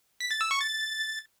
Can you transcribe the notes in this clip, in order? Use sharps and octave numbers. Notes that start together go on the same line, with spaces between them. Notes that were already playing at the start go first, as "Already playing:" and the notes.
B6
A6
E6
C#6
A6